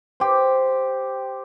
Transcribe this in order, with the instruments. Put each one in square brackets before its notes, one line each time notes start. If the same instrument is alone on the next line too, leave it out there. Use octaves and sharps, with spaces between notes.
[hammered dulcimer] G4 C5